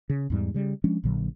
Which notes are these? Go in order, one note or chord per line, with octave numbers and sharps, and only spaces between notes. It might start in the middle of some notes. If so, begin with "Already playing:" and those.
C#3
E2 G#2 G3
C#3 G3
F3 G#3 C#4 D4
A#1 A#2 D3 F#3